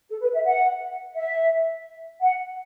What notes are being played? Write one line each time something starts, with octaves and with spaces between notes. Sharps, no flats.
A4
B4
E5
F#5
E5
F#5